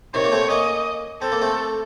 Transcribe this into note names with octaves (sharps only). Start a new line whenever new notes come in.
C3 D#3 C#5
A#3
A3 C4
A#3 C#4 D#5
C4 A4
A#3
A3 C4